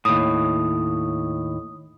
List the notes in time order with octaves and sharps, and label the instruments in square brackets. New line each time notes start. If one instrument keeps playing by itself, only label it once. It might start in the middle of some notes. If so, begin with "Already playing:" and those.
[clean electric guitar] D#2 A2 [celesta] D#6